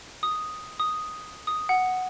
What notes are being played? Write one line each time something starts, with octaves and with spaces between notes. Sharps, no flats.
D#6
D#6
D#6
F#5